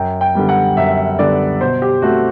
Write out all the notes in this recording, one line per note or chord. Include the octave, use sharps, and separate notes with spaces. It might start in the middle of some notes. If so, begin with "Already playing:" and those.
Already playing: F#2 G5
G5
D3 G3 B3
F#5
F#2 E5
D3 G3 B3 D5
B2 C5
G4
A3 C4 F#4